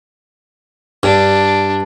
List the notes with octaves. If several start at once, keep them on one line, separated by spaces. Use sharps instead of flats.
G2 D4